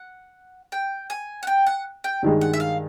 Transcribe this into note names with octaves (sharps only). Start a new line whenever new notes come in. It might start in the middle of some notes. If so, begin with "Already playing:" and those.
Already playing: F#5
G5
G#5
F#5
G5
F#5
G5
G2 D#3 G#3
F#5
E5
F5